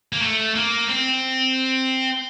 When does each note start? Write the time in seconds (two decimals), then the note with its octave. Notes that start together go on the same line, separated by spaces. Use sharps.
0.13 A#3
0.22 A3
0.55 A#3
0.89 C4